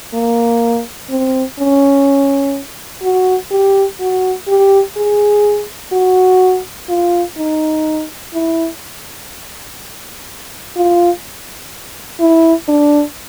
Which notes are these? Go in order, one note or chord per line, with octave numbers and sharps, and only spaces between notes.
A#3
C4
C#4
F#4
G4
F#4
G4
G#4
F#4
F4
D#4
E4
F4
E4
D4